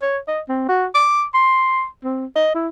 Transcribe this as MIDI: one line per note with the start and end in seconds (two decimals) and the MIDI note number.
0.02 0.18 73
0.28 0.41 75
0.49 0.66 60
0.69 0.86 66
0.94 1.24 86
1.34 1.85 84
2.04 2.26 60
2.36 2.52 75
2.55 2.68 64